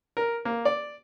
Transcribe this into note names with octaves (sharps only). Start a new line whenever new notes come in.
A#4
A#3
D5